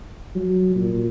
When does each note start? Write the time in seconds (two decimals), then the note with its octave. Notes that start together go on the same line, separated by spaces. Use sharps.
0.35 F#3
0.75 A#2